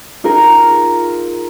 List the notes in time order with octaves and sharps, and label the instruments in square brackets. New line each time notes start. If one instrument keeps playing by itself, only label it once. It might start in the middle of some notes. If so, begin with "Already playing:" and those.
[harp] D#4 F4 G#4 A#4